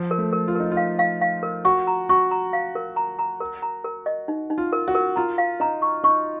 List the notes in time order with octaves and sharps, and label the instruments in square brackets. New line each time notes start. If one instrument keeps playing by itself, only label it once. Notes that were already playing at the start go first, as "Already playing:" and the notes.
Already playing: [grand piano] F3
[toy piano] A#4
[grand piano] A3
[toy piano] A#4
[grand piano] F4
[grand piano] D#4 [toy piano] A#4
[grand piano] F4
[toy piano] F5
F5
F5
A#4
[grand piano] F#4 [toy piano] C#6
[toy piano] A#5
[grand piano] F#4 [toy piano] C#6
[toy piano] A#5
F5
A#4
A#5
A#5
A#4
A#5
A#4
D#5
D#4
D#4
[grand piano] F4
[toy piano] A#4
[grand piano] F#4
[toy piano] A#4
[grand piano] F4 [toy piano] A#5
[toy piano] F5
[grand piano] D#4 [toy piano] A#5
[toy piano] C#6
[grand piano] D#4 [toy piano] C#6